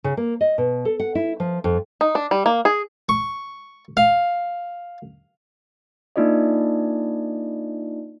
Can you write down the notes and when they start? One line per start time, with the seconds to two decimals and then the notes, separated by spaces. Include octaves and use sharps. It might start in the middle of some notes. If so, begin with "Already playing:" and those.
0.04 C#3
0.17 A#3
0.41 D#5
0.58 B2
0.85 A4
1.00 F#5
1.15 E4
1.40 F3
1.64 F2
2.01 D#4
2.15 D4
2.31 G3
2.46 A#3
2.65 G#4
3.09 C#6
3.97 F5
6.16 A#3 D4 D#4 F4 D5 D#5